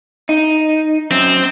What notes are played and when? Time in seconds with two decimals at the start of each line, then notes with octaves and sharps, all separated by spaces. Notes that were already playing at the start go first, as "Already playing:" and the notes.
0.29 D#4
1.11 F#2 C4